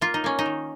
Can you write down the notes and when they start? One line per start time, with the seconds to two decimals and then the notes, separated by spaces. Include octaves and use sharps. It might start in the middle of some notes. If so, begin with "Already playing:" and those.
0.01 A#3 F4
0.14 D#4
0.24 A#3 C#4
0.39 D#4
0.46 D#3